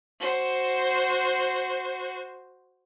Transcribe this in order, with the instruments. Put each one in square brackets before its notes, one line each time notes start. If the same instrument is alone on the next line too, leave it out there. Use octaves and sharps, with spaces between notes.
[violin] F#4 C5